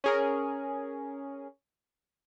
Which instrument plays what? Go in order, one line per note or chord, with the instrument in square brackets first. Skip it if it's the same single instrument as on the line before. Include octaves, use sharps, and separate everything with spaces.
[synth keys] C#4 G#4 A#4